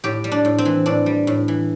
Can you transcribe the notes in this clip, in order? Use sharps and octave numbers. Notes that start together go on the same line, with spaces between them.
A2 G4
G3
D4
A2
C4
E3
A2 D4
G3
A2
E3